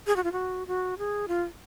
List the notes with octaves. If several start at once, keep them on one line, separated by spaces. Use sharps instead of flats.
G#4
F#4
F4
F#4
F#4
G#4
F4